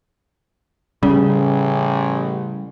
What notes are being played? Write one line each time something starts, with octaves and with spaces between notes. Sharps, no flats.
A1 C#3 G3